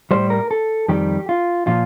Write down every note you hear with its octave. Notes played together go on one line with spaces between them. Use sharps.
A2 G3 C5
A#4
A4
F2 D#3 G3 G4
F4
A#2 F3 F4